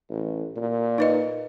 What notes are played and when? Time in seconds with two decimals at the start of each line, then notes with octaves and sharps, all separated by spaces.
0.10 A1
0.57 A#2
0.98 D#4 B4 D#5